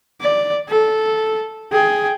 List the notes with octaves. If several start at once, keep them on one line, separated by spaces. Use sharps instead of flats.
D5
A4
G#4 G5